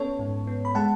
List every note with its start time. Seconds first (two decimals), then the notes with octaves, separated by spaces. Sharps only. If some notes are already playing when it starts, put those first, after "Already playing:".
Already playing: B3 C#4 A4 C#5
0.19 G#2
0.47 B3
0.65 B5
0.75 G#3 F#5 A5